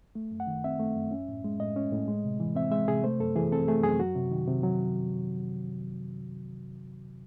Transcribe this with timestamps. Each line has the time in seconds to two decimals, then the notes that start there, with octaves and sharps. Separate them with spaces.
0.15 A3
0.31 F#2
0.40 F#5
0.47 D#3
0.64 C4 E5
0.80 A3
0.95 F#2
1.11 C#4
1.28 A2
1.44 G#3
1.59 A2 D#5
1.76 C#4
1.92 A2
2.08 G#3
2.24 C3
2.40 E3
2.55 C4 E5
2.71 G#3 E5
2.88 C3 G#4
3.03 A3 C5
3.20 F#2 A4
3.36 E3 G#4
3.52 C4 A4
3.68 A3 G#4
3.83 F#2 G#4
3.99 F#3 F#4
4.16 C3
4.31 D#3
4.47 C3
4.63 F#3